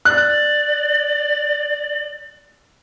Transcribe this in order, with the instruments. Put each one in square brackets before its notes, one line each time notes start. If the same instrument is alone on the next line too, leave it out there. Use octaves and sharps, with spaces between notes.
[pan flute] D5 [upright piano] F#6